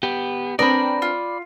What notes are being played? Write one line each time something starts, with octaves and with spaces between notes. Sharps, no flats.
B3 G4
C4 D4 A#4 B4 D5 G5 B5 D#6
F4